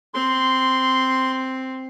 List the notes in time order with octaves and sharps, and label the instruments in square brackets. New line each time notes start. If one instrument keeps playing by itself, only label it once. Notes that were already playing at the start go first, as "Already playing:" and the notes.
[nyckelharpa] C4 [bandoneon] C6